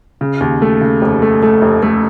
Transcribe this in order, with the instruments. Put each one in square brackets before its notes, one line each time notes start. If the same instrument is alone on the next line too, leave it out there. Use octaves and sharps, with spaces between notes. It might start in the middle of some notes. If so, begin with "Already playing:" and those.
[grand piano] C#3
D#2
A3
C#3
F1
A3
A3
F1
A3